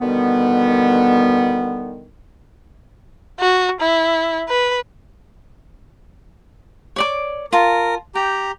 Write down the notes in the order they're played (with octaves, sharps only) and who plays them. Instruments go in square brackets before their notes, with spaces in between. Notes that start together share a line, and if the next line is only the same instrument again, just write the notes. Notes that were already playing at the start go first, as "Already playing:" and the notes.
[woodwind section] B2 D3 D#3 G3 B3
[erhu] F#4
E4
B4
[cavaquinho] C#5 D5 D6
[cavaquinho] F4 A5 [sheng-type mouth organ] A#4
[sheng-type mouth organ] G4 A#5 [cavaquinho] G5